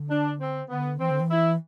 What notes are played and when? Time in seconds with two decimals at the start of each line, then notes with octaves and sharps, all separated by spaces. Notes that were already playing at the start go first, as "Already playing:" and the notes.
Already playing: D3
0.10 D4
0.40 C4
0.70 D3 B3
1.00 E3 C4
1.10 D3
1.20 E3
1.31 E4